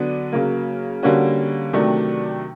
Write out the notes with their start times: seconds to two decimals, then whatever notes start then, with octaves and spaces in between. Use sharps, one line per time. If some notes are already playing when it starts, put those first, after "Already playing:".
Already playing: D3 F#3 B3 D4
0.32 C#3 F#3 A#3
1.03 D3 G3 A#3 C#4 F#4
1.73 C3 D#3 F#3 A3 D4